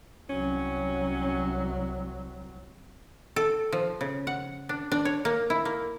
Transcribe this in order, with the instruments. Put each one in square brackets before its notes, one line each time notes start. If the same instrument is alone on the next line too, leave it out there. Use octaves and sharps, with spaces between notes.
[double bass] C2 F#3 [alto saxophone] C#4
[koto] A4
F3
C#3
F#5
D4
D4
C#5
A#3
E4
A#3